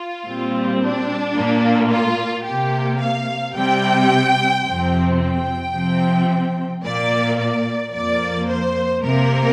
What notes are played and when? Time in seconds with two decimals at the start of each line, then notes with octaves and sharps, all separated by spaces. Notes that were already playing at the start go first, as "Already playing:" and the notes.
Already playing: F4
0.26 A#2 G3 C4
0.80 D4
1.35 A#2 A#3
1.90 F4
2.45 C3 A#3 G4
3.00 F5
3.54 C3 G3 C4 G5
4.64 F2 C3 F3 C4
5.19 G5
5.74 C3 F3 C4
6.83 A#2 A#3 D5
7.38 D5
7.93 F2 F3 A#3 D5
8.48 C5
9.02 C3 A#3 A#4